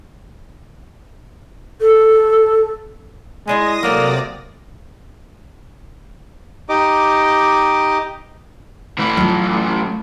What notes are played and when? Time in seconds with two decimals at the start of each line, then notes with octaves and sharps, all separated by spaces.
1.81 A4
3.48 G#3 E4 D5 D#5 D#6 A#6
3.83 C3 F#3 A#3 F#4 A4 D5
6.69 D#4 G4 D#5 D6
8.98 A2 E3
9.17 F#3 F4